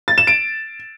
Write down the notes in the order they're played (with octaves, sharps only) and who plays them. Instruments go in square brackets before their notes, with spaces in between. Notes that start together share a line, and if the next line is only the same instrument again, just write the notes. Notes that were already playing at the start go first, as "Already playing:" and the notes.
[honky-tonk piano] A6
E7
D7